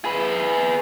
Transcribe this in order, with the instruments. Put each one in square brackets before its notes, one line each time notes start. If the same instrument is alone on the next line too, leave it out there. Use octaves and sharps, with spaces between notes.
[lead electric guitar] G#4 B4